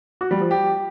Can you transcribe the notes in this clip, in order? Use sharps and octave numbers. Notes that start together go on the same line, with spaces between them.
F#4
G3
F3
G4